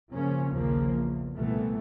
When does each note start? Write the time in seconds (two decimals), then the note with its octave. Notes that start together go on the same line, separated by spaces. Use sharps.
0.11 C#3 F3 A#3 C#4
0.53 A#1 D#2 C#3 F3 A#3
0.93 E2
1.33 C2 A#2 E3 A3 B3